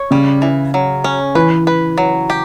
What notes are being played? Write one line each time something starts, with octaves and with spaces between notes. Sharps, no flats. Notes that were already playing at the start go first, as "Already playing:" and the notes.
Already playing: C#5
C#3 G3
E3
F#3
C#4
E3 B4
B4
F#3
G4